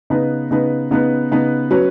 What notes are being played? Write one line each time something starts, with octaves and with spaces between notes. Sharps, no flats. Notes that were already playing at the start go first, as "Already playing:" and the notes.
C#3 B3 D#4 B4
C#3 B3 D#4 B4
C#3 B3 D#4 B4
C#3 B3 D#4 B4
F#3 C#4 B4